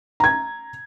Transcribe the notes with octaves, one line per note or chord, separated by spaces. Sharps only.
A#5 G#6